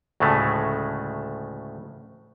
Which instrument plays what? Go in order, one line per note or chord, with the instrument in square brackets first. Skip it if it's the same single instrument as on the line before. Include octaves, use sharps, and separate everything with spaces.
[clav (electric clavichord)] D2 A2 C#3 G#3 A3